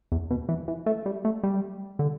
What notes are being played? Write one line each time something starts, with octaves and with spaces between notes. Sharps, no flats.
E2
B2
E3
E3
A3
G3
A3
G3
D3